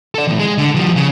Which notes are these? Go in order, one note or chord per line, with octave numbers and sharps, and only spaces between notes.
A4 D5
E2 A2
G#3
D3
F3 G3
C#3